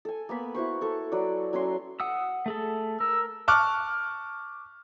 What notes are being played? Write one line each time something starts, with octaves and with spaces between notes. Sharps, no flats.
A4 G#5
A#3 B3 B5
E4 F#4 C5 C#6
A4 C#6
F#3 B4 D5
F#3 C#4 C#5 C6
F#5 D#6 E6
A3 G#4 A4
A#4 E6
A5 C#6 D6 F6 F#6